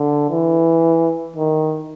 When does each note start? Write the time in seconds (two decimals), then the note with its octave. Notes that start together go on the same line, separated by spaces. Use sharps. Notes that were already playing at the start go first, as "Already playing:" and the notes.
Already playing: D3
0.31 E3
1.36 D#3